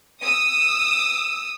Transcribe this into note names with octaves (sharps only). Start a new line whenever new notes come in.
D#6 E6